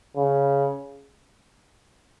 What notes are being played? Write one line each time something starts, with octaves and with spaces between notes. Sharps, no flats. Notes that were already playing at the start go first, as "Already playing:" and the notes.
C#3